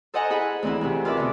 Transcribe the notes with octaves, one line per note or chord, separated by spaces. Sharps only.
A4 C5 D#5 F#5 G#5 A#5
E4 G#4 F#5 B5
D2 E3 C4 D#4 E4
D2 C3
F4 A#4 B4 E5 D6
B2 D3